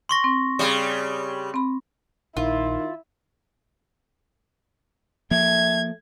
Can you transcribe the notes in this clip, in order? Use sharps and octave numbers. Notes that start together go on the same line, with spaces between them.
C6 C#6 A#6
C4
C#3 G3
C4 B5
A#1 D#3 E4 F4
F3 A3 A#3 G#6